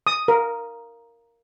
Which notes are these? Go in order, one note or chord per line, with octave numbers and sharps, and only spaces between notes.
D#6
A#4